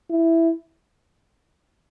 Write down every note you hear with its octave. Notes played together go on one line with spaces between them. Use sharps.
E4